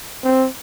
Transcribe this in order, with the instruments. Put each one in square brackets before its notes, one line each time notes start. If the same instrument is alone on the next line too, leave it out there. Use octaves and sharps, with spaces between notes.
[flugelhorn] C4